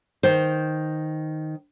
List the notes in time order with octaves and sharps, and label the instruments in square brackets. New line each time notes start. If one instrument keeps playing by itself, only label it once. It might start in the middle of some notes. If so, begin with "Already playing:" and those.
[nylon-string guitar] D#3 C5